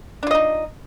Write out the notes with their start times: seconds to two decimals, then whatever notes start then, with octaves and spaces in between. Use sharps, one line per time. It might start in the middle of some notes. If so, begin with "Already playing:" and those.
0.23 D4
0.27 F4
0.31 D#5
0.35 D#4